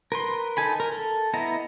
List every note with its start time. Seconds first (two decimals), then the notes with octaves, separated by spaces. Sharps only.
0.12 A#4 B4 C6
0.57 D#4 A4 G#5 B5
0.80 A#4
0.92 A4
1.34 B3 E4 D#5 A#5